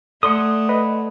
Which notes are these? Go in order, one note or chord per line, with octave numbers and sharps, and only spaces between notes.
A3 A4 D5 F#5 C6 D#6
B4 D#5